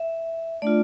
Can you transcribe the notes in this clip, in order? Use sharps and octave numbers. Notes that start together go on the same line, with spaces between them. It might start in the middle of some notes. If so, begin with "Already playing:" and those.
Already playing: E5
A3 D4 F4 D5